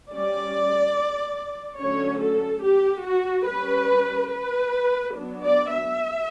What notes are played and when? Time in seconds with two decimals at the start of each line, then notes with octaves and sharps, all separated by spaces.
0.10 G3 C#4 D5
1.79 D3 F#3 A3 C#4 C#5
2.22 A4
2.64 G4
3.06 F#4
3.48 G3 C#4 B4
4.33 B4
5.17 F#3 B3 D4
5.45 D5
5.73 E5